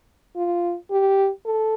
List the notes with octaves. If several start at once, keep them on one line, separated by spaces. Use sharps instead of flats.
F4
G4
A4